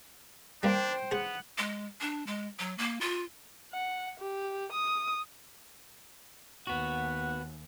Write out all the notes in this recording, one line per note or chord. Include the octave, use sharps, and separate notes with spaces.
G3 A#3 D4 C5 G5
B3 G#4 C5 F#5
G#3
D4
G#3
F#3
A#3
F4
F#5
G4
D#6
D#2 B3 F#4 F#5